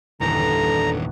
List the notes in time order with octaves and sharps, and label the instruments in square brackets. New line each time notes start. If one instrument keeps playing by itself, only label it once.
[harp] G1 E2 [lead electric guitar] A#2 D#3 [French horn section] D3 A4 [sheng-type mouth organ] A#5